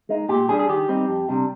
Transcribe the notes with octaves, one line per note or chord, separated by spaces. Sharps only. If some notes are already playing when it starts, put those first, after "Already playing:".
G#3 D#4
A#2 G4
G3 D4 G#4
G#4
D#3 G4
G3 C4 D#4
F2
C3 G3 D4